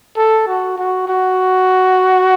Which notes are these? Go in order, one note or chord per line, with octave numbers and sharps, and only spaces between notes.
A4
F#4
F#4
F#4